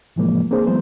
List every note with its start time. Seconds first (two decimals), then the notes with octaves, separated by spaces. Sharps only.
0.16 A2 C3 E3 F3 G#3 A#3
0.51 A#3 C4 D4 G#4 C5
0.67 E3 F#3 G#3 B3 C5